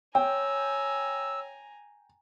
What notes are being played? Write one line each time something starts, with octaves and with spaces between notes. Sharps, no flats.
C#5 G5 G#5 A#5 E6